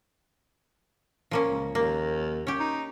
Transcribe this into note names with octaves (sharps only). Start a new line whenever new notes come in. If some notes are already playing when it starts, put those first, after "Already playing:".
F3 A#3 C#4
C#2
D#2 A#3
C#4 G4
D#4